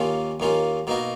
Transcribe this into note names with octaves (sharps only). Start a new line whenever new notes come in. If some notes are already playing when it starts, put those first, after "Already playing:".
Already playing: D#2 D#3 A#3 C#4 F4
D#2 D#3 A#3 C#4 F4
B2 A#3 D#4 F#4 A#4